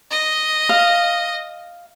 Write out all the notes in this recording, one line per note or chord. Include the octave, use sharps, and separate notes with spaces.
D#5
F5